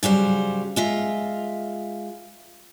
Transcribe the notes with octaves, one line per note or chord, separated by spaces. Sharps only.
C#3 F#3 G3 C5
G#3 F4 E5